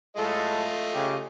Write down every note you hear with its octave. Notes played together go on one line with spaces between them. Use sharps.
A2 G#3 A3 F4 A4 D#5
C#3 G4